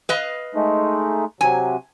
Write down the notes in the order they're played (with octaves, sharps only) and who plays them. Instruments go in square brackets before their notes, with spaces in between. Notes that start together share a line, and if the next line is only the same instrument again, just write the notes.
[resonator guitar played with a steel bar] B4 D#5 F5
[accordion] G#3 A3 D#4
[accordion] C3 F#3 [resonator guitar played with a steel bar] G#5